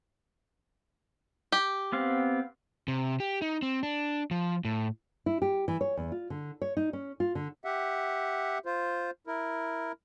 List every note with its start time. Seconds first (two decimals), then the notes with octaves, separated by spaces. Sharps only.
1.52 G4
1.92 B3 C4 F5
2.88 C3
3.20 G4
3.42 D#4
3.62 C4
3.83 D4
4.31 F3
4.65 A2
5.26 E4
5.42 G4
5.68 E3
5.81 C#5
5.97 E2
6.12 F4
6.30 D3
6.62 C#5
6.77 D#4
6.93 C#4
7.20 F4
7.35 D3
7.65 G4 E5 F#5
8.66 F4 C5
9.27 E4 A#4